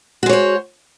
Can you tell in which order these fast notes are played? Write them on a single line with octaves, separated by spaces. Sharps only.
F#4 G#3 C#5 C5